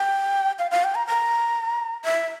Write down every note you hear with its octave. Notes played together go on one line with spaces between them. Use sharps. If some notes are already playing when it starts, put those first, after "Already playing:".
Already playing: G5
F5
F5
G5
A#5
A#5
E5